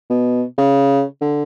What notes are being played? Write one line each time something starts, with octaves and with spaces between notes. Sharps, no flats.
B2
C#3
D3